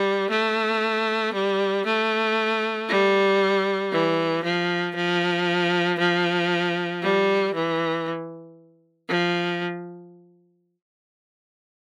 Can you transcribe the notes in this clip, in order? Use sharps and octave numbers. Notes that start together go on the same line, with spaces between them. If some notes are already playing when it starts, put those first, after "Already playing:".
Already playing: G3
A3
G3
A3
G3
E3
F3
F3
F3
G3
E3
F3